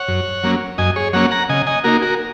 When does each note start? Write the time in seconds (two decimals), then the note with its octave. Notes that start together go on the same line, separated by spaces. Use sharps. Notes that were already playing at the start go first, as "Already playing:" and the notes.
Already playing: C#5 F#5
0.08 F#2
0.43 F#3 A#3 C#4
0.78 F#2 D#5 G#5
0.96 G#4 C#5
1.13 F#3 A#3 C#4 C#5 F#5
1.31 F#5 A#5
1.49 C#3 D#5 G#5
1.67 D#5 G#5
1.84 A#3 D#4 F#4 A#4
2.02 F#4 A#4